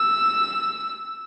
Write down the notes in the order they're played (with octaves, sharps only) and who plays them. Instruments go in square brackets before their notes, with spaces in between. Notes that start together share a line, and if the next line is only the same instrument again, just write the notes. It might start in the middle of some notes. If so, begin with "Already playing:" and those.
Already playing: [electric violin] E6